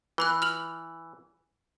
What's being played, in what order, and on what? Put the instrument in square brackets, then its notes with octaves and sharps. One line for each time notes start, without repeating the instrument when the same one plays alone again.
[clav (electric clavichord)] E3 [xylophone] B4 B5 F#6
[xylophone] F6 F7 F#7